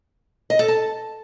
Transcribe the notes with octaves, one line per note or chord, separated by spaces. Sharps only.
D#5
A4
A5